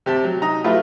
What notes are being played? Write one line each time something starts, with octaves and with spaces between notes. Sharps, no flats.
C3 G4 A5
F#3
D#4 A#5 D#6
F#3 A3 E4 F4 G4 B4